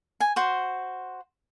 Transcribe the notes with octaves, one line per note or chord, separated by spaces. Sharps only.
G#5
F#4 C5